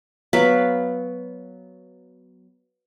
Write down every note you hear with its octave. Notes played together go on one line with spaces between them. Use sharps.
F#3 B3 F5 B5